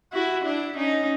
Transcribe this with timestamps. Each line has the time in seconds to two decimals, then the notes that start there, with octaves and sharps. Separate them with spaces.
0.13 E4 F#4
0.44 D4 E4
0.77 C#4 D#4